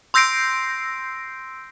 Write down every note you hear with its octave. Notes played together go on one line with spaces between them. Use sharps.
C6 E6 G6 A#6 C7 D7